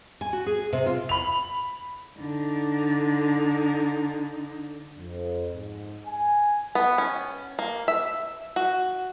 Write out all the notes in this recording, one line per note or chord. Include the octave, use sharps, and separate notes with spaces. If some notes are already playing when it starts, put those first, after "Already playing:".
G#5
F#4
G#4
C3
F4
B5 F7
D3 D#4
F2
G#2
G#5
B3
C#4
A#3
E5
F#4